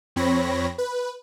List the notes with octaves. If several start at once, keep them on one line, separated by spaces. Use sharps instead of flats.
F2 C4 C#5 B5 A#6
B4